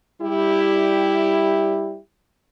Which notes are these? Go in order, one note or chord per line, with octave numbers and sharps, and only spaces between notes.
G3 E4 G4